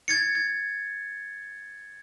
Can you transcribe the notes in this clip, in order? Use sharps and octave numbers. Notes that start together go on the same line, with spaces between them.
G#6 A6 C#7
G#6